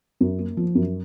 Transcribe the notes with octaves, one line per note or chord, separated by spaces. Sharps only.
F#2
A#3
F3
F#2